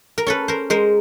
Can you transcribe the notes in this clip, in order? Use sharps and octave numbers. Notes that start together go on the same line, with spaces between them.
A#4
C#4 A4 B4
A#4 C5
G#3 A#4 C5